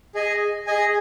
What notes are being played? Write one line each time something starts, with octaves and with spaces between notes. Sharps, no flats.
G#4 D#5 G#5
G#4 D#5 G#5